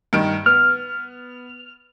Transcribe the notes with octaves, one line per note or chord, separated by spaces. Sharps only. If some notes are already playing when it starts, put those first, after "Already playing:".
G2 D#3 D7
B3 F6